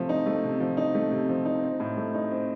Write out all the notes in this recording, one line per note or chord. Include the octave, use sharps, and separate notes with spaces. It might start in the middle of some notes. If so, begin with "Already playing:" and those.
Already playing: C3 F3 A3
D#4
A3
C3
F3
D#4
A3
C3
F3
D#4
C4
A2
A3
D#4
C4